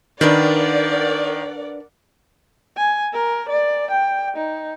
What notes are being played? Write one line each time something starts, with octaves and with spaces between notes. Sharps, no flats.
D#3 D4 A#4 B4 D5 F5 F#5
G#5
A#4
D5
G5
D#4